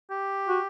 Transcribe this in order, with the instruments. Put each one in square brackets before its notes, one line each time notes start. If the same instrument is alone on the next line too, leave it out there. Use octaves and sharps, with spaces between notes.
[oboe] G4
[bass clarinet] F#4